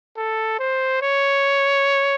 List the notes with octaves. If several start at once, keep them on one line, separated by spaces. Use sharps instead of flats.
A4
C5
C#5